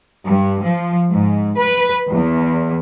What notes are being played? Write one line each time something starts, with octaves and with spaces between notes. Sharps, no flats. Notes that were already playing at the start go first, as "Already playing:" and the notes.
G2
F3
G#2
B4
E2